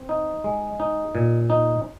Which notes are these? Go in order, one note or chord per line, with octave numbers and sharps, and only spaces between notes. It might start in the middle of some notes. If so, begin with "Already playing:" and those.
Already playing: C4
D#4
G#3
D#4
A#2
D#4